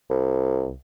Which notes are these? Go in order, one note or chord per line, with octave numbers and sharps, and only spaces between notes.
C2